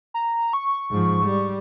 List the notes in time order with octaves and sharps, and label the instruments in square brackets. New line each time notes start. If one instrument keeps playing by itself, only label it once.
[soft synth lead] A#5
C#6
[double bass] G#2 F3
G3